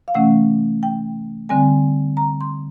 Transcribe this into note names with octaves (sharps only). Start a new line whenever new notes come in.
F5
C3 E3 A3 C#4 F#5
G5
D3 G3 C4 G#5
A#5
C6